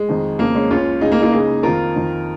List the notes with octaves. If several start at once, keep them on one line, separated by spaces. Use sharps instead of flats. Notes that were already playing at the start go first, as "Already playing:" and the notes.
Already playing: G#3
F2 D#3
F2 C#3 A#3
G#3 C#4
C#2 C#3 C#4 F4
C#2 C#3 D#4 G#4
A#3
A#3 D#4
C#2 C#3 D#4 G#4
F2 D#3 F4 A#4
F2 D#3